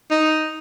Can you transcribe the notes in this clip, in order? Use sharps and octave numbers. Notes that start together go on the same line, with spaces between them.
D#4